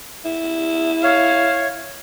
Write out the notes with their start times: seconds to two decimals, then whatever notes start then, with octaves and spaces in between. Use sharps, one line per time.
0.25 E4
1.03 C#5 F5